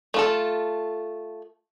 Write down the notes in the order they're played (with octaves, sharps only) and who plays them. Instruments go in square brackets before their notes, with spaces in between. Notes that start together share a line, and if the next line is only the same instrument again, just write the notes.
[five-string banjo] A3 F4 A4